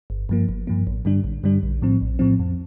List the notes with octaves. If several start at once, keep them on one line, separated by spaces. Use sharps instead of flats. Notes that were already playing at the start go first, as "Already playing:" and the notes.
G1
G2 F3 A#3
G1
G2 F3 A#3
A1
G2 D3 G3 D4
A1
G2 D3 G3 D4
A#1
A2 F3 C4
A#1
A2 F3 C4
F2